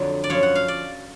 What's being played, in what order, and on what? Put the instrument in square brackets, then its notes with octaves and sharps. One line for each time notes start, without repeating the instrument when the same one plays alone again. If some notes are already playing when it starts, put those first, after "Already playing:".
Already playing: [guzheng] F2 D3 F#3
D5
F#2 F3 C#5
F#5
F5
D5